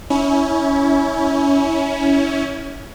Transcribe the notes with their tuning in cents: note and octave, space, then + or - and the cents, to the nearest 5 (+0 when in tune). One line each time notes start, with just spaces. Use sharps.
C#4 +15 E4 -20